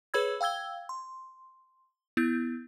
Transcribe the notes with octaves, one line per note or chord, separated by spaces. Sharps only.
G#4 B4 C#5 B5 E6 G#6
F5 G5 E6 G#6 G7
C6
B3 E4 G6